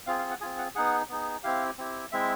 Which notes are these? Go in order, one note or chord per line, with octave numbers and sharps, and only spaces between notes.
C4 F4 G#4 F5
F5
F#5
C4 F4 G#4 G#5
F#5
B3 D#4 G#4 F#5
B3 D#4 G#4
C4 E4 G4 F5
C4 E4 G4
G#3 C4 E4 E5